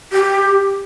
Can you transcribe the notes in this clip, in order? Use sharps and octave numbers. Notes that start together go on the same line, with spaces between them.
G4